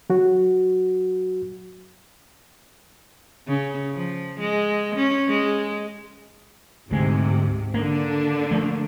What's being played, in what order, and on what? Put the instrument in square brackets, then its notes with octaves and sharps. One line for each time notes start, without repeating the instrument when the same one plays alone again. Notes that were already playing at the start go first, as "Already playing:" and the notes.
[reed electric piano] F#3 F#4
[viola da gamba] C#3
F3
G#3
C#4
G#3
[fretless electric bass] D2 G#3 [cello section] G#2 C3
[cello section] D3 D4 [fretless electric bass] A#3
[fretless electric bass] F3 A3 A#3